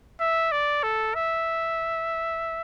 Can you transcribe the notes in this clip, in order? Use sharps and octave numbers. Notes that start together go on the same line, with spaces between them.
E5
D5
A4
E5